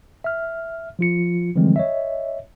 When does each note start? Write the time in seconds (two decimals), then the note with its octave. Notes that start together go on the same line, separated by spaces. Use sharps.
0.24 E5 F6
0.99 F3 F4 C#7
1.56 D3 E3 F3 G3 G#3 C4
1.76 C#5 D#5 E5